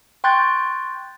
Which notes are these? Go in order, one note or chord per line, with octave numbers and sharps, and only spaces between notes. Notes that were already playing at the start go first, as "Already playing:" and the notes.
G5 C6 C#6 F#6 G6 A6